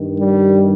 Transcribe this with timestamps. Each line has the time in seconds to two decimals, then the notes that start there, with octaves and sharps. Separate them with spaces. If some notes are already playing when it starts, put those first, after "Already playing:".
Already playing: G2 D#3
0.18 G3